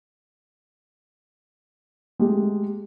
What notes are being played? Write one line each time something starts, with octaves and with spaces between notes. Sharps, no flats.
G#3 A3 G4